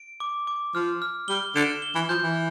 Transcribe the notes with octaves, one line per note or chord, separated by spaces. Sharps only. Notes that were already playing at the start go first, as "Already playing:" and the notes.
Already playing: D7
D6
D6
F3 F6
F6
G3 G7
D3 E7
G7
E3
F3 G6
E3